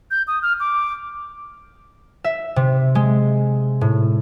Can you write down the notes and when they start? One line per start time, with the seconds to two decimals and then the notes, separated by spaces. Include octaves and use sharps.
0.11 G6
0.28 D#6
0.42 F6
0.60 D6
2.24 E5
2.56 C3
2.95 G#3
3.81 A2